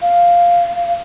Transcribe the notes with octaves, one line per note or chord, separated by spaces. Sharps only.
F5